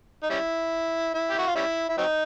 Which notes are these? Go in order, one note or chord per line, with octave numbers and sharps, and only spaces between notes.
D#4
G3 C#4 E4
E4
G4
F#4
F4
G3 C#4 E4
E4
F#3 C4 D#4